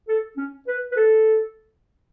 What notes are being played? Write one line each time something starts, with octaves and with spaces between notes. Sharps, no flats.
A4
C#4
B4
B4
A4